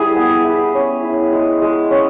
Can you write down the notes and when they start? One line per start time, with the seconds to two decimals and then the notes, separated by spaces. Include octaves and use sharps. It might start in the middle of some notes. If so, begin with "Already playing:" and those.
Already playing: G3 E4 G#4
0.16 B3
0.45 E4
0.74 C#4
1.03 E4
1.33 G#3
1.62 G#3
1.91 C#4